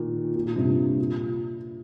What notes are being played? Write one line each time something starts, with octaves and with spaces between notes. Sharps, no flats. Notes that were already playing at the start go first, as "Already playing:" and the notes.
Already playing: A#2 D#3
A#2
A#2
G2 C3
A#2